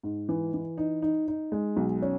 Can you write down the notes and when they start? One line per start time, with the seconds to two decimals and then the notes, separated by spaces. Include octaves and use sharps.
0.03 G#2
0.29 E3
0.54 E3
0.78 D#4
1.02 D#4
1.28 D#4
1.52 G#3
1.77 B1
2.02 C#4